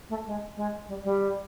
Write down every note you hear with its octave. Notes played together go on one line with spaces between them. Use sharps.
A3
G#3
G#3
G3
G3